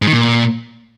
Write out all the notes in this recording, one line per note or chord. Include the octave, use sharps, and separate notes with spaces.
G#2
D#3
A#2